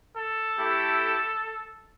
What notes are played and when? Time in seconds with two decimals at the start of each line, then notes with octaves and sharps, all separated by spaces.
0.17 A4
0.57 A3 E4 G4